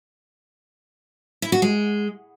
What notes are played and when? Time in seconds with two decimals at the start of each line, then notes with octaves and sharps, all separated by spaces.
1.42 E4
1.52 F#4
1.62 G#3